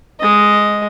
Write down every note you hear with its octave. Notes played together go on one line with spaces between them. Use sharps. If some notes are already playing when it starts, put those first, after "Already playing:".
G#3 D#5